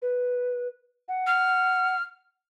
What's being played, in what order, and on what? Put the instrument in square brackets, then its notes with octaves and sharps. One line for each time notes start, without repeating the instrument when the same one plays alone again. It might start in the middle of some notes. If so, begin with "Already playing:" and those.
[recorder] B4
F#5
[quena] F6